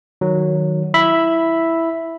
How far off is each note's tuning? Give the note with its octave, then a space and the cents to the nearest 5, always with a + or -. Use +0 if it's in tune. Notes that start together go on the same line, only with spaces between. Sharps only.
D#3 +0 F#3 +0
E4 +0 E5 +0 B5 +0